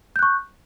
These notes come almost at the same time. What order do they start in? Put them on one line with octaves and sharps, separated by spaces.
G6 F#6 C#6